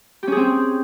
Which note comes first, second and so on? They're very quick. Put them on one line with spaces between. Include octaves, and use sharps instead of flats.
G4 C#4 G#4 C4